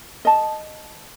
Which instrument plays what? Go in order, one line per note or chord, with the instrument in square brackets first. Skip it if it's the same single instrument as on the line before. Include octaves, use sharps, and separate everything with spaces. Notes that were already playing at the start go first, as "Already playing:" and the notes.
[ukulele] D#5 A5